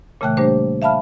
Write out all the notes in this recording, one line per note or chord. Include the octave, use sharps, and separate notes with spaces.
A#2 C#3 E3 A3 G5 F#6
G3 A3 A#3 D4 G4 C5
E5 F5 A5 B5 F6